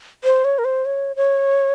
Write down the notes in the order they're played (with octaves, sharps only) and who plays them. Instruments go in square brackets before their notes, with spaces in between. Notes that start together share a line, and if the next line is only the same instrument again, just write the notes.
[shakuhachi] C5
C#5
A#4
C5
C#5
C#5